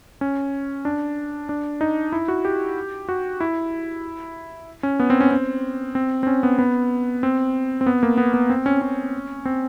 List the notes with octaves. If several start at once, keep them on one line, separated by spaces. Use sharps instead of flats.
C#4
D4
D4
D#4
E4
F#4
G4
F#4
E4
C#4
B3
C4
C#4
C4
C4
C4
C#4
B3
B3
C4
C4
B3
A#3
B3
B3
C4
C#4
C#4
C4